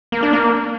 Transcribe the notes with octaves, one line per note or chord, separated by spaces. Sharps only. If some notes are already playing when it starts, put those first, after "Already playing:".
A#3
D4
A#3